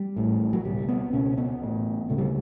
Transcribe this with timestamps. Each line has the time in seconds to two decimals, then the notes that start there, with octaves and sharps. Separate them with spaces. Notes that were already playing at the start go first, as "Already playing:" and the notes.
Already playing: G3
0.16 A1 A2
0.53 F#3
0.65 C#2 B2 G3
0.89 B3
1.13 C#2 B2 C#4
1.38 B3
1.62 A1 A2
2.09 E1 D2 C#3 A3
2.18 G3